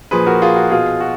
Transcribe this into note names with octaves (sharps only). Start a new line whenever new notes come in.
A#2 F3 G#4 B4
F#4 A#4
F4 G#4
F#4
B2 F4 G#4
F#4